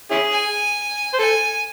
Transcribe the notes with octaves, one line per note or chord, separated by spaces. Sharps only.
C#4 E4 G#4
G#5
C5
A4 G#5